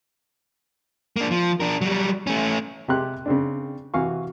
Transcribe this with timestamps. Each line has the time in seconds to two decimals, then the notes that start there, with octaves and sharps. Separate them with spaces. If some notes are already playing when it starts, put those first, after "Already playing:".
1.16 A#3 D4
1.31 F3
1.60 D4 A#4
1.81 F#3 G3
2.27 A3 C#4
2.88 C3 G#3 G4 C6 F#6
3.26 C#3 C4 D4
3.94 C3 E3 F#4 F5 G#5 C#6